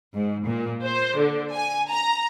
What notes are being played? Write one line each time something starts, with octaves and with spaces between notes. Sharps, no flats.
G#2
A#2
C5
D3
G#5
A#5